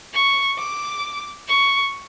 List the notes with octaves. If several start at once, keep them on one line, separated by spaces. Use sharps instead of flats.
C#6
D6
C#6